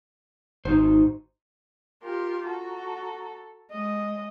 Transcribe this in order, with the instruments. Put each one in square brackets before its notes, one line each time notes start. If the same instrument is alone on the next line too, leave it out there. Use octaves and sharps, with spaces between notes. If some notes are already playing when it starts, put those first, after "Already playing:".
[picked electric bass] G#1 [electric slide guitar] D#4 F#4 C5
[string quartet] F4 G4 C6 [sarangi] A#4
[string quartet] F#4 A#5 [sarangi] A4
[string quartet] G#3 [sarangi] D#5